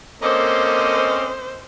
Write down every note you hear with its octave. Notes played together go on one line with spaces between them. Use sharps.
A#3 C4 C#4 A4 C5 D5 D#5